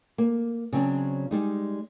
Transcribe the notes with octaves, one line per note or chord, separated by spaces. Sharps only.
A#3
C#3 F#3 C4 D4
G3 G#3 D#4